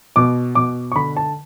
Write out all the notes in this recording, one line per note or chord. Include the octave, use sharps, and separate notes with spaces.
B2 D6
B2 D6
C#6
D3 B5
A5